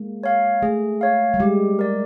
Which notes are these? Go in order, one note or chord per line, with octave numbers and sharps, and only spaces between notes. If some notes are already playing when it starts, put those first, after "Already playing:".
Already playing: G#3 A#3
C#5 F5
A3 G#4
C#5 F5
G3
G#3 G4
A#4 D5